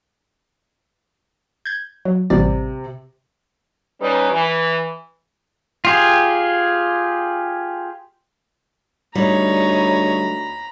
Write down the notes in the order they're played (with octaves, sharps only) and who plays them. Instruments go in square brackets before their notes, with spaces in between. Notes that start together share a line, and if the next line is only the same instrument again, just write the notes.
[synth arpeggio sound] G6 G#6
F#3
[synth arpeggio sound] A1 G3 D5 [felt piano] C3
[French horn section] G3 C#4 D#4 B4
E3
[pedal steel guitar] F4 G4 G#4
[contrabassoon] D2 [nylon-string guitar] G3 [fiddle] D#4 C#5 [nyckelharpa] A#5 B5